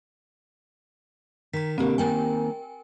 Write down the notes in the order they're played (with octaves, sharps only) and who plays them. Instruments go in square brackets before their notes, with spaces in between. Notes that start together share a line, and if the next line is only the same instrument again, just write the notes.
[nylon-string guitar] D#3 [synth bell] A#5 B6
[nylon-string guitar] B2 D3 A#3 [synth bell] C4 G4
[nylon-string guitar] D#3 A#3 C4 [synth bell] A#4 G5 G#5